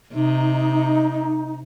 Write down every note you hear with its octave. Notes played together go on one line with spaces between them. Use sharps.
C3 D#4